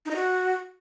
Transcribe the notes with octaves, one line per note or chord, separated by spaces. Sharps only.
D#4
D#5
F#4